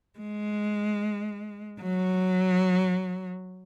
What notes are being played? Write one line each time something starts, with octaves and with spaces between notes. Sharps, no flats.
G#3
F#3